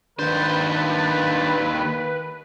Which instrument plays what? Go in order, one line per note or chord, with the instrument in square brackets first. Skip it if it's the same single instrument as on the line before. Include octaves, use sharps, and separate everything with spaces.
[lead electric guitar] D#2 C5 [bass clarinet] D#3 [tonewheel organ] D4 A6 [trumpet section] B4